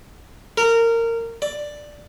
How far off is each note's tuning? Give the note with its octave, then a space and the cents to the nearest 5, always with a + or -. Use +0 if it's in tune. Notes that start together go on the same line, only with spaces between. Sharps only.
A#4 -20
D5 +5